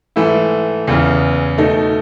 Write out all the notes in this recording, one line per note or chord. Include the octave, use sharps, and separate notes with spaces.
G#2 E3 A3 E4
E2 C#3 E3
B2 A3 D#4